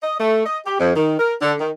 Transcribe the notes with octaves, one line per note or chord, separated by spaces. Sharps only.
D#5
A3
D#5
G4
F2
D#3
A#4
D3
D#3